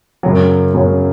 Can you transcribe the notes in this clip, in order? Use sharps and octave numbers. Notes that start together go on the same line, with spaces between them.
F#2 C#3 F#3
F#2 C#3 F#3